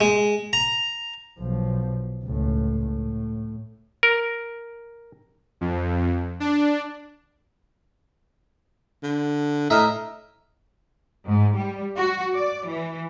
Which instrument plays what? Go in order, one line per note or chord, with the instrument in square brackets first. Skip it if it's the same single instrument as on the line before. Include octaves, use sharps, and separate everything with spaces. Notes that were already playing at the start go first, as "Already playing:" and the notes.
[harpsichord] G#3
A#5
[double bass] B1 F3
C#2 A2
A2
[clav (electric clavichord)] A#4
[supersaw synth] F2
D4
[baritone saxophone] D3
[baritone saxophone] A2 [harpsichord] D#5 E5 [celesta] A#5 D#6 F6
[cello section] G#2
G3
F#4
D5
E3